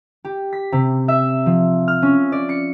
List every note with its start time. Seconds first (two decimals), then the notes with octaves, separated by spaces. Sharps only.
0.25 G4
0.53 B6
0.72 C3
1.08 E5
1.46 F3
1.88 F6
2.02 C#4
2.32 D5
2.49 C#7